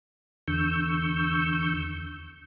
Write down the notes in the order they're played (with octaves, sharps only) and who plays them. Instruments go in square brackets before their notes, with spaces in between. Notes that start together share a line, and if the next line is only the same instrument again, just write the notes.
[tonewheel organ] E2 D3 C#6 E6 G6